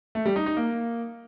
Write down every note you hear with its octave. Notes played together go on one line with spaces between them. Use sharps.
A3
G3
D#4
D#4
A#3